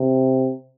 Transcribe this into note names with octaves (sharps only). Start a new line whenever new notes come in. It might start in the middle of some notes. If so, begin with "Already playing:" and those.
Already playing: C3